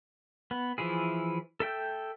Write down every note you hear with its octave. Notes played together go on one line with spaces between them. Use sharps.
B3
E3 F3 E4 G#4
A4 E5 G5 G6